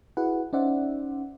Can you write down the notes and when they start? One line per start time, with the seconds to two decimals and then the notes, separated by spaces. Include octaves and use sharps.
0.17 E4 F#4 G#4 B4 F#5
0.53 C#4 D#4 C5 D5 E5 F#5